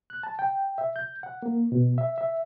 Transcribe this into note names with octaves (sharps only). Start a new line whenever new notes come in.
F#6
A5
G5
E5
G6
F#5
A#3
B2
E5
E5